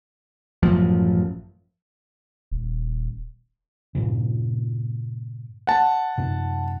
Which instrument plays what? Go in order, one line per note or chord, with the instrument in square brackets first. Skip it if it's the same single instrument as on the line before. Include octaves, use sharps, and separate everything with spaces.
[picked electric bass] A1 F#2 F3
[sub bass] D#1
[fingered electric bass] G2 A#2 C#3
[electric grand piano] F#5 A5
[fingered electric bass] F#2 C3